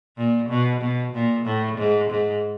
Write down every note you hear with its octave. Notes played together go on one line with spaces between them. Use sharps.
A#2
B2
B2
A#2
A2
G#2
G#2